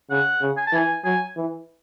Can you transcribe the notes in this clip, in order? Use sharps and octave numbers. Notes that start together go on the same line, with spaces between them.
C#3 F#5
C#3
G#5
A5
E3 G#5
F#3 G#5
E3